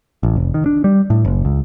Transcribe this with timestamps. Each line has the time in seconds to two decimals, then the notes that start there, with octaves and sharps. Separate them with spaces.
0.23 A1
0.36 F1
0.54 D#3
0.66 D4
0.84 G3
1.10 A2
1.25 F#1
1.45 C#2